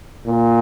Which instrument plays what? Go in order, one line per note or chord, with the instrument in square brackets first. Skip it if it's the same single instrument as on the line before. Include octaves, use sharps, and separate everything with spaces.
[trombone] A#2